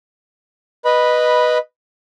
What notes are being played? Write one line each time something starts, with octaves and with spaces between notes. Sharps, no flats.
B4 D#5 B5